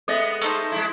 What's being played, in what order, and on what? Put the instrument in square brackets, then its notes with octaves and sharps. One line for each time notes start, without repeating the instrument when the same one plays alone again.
[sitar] G#3 B3 G#4 [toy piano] A4 D#5 E5
[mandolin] A3 D#4 C5
[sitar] G#3 E4